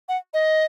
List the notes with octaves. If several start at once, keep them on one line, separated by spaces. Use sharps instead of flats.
F#5
D#5